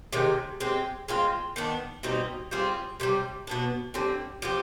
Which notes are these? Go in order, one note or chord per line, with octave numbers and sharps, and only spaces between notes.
C3 D#3 G#3
G#3 C4 G4
G#3 C4 F4
D#3 B3 D4
B2 G3 C4 D#4
G3 C4 F4 G#4
C3 D#3 G3
B2 B3 D4
D3 G3 C4
F3 C4 G4